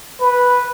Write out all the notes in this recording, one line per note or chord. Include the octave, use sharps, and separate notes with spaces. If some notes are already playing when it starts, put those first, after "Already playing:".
B4